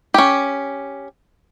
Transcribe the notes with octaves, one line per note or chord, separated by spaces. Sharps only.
C#4 G4